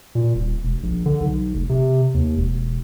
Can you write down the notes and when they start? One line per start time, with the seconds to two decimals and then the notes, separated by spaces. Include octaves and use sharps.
0.15 A#2
0.35 D#1
0.63 E1
0.83 A#1
1.06 D3
1.21 B1
1.54 F1
1.69 C3
2.14 D#2
2.37 E1